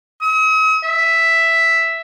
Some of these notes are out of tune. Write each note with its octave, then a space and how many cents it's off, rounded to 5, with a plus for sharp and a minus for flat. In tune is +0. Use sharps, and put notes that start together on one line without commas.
D#6 +45
E5 +0